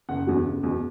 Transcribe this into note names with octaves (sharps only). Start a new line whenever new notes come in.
F#1 F#5
E2 D3 F#3
F#1
E2 B2